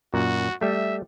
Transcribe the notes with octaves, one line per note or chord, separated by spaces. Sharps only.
F#2 A#2 F#4
G3 A3 E5